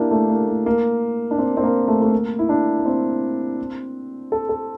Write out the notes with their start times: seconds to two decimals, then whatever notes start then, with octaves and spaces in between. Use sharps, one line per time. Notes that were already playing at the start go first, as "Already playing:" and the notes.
Already playing: A#3 D4 E4 G4
0.11 A3
0.30 A#3
0.48 A3
0.66 A#3
1.31 D4
1.39 C4
1.57 C4
1.63 A#3
1.88 A3
2.02 A3
2.12 A#3
2.39 E4
2.49 D4
2.79 A#3
2.86 C4
4.32 A4
4.49 A4